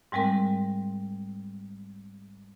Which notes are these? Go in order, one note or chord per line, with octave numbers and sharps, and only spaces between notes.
G#2 G3 G#3 C4 A#4